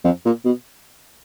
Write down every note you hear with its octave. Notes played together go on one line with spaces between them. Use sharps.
F2
A#2
B2